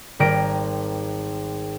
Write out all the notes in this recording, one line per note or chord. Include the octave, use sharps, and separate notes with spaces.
G#1 G3 A#4 D7